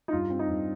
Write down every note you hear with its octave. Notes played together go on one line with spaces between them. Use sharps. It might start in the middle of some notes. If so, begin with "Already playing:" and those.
D#4
G2 F4
C4
D#4
G2